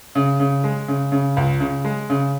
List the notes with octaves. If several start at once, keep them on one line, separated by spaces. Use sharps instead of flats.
C#3
C#3
G#3
C#3
C#3
C#2
C#3
G#3
C#3